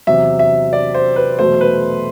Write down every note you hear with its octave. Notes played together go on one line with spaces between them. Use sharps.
E2 C3 F#3 E5
E5
D5
C5
B4
E2 B2 F#3 A3 C5
B4